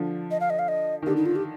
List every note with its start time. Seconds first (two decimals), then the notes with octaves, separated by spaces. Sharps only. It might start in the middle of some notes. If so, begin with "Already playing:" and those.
Already playing: D3 F3
0.31 D#5
0.40 F5
0.50 D#5
0.59 F5
0.68 D#5
1.02 D#3
1.06 D3 G4
1.17 D#4
1.26 F4
1.36 G4